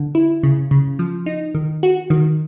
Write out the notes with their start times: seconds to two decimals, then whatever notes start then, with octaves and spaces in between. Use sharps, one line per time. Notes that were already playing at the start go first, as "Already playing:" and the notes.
Already playing: D3
0.15 E4
0.43 C#3
0.71 C#3
0.99 F3
1.26 D#4
1.55 D#3
1.83 F#4
2.10 D#3